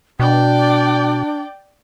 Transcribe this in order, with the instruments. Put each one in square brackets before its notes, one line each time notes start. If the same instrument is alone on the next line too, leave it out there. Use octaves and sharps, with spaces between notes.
[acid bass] B2 [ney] D4 [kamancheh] D5 G5